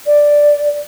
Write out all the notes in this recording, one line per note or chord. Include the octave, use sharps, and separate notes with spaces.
D5